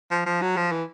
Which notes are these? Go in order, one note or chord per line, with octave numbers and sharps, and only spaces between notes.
F3
F3
F#3
F3
E3